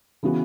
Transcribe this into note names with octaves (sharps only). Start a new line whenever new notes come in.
C#3 E3 B3 F#4